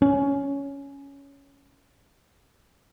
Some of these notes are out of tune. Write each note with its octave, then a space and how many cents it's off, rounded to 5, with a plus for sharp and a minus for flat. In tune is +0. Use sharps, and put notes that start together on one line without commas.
C#4 +10